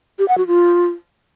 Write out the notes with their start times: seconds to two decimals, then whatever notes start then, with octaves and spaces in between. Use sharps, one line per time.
0.19 G4
0.28 F#5
0.38 F#4
0.47 F4